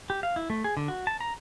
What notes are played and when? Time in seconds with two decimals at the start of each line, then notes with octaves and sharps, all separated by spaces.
0.10 G4
0.23 F5
0.36 E4
0.50 A3
0.64 G#4
0.77 D3
0.88 F#4
1.07 A5
1.21 A#5